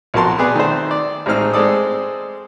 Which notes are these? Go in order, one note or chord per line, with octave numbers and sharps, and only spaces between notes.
B1 F3 F#4 A#4 A5 C6
B3 G#4 D5
D#3 A3 C4 C5
D5
A1 G#3 C4 D#4 F6
G#3 C4 A4 D5 D#6